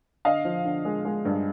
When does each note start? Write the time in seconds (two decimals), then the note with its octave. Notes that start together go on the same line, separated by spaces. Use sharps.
0.25 D3 D#5 F5
0.45 F3
0.65 D3
0.85 G#3
1.05 G#3
1.25 G2